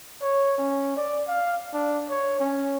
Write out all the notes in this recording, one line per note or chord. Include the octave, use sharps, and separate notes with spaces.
C#5
C#4
D5
F5
D4
C#5
C#4